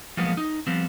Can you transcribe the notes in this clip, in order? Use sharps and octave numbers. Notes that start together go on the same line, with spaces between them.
F3 F#3 G#3 A#3 B3
D#4
F3 G3 B3 C4